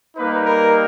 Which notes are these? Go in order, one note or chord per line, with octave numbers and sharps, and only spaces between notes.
G3 A#3 D#4 B4
A#4